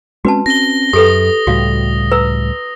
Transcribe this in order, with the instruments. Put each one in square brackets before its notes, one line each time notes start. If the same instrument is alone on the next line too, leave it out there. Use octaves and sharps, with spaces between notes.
[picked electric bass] G#3 C4 C#4 [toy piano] F#4 B4 A5
[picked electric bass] C4 C#4 [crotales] A#6 G7
[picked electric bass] F#2 [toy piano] G4 A4 B4 [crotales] D#6
[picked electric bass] C#2 A2 G3 [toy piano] F#4 F5
[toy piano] B4 A#5 E6